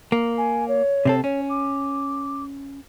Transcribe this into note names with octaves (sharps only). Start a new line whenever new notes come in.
A#3
G#5
C#5
C3 C4 A4
C#4 C#5
D6